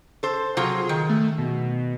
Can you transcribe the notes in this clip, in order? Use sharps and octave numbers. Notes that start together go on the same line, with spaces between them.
A4 C5
C3 F#3 F4 G#4
D#3
A3
B2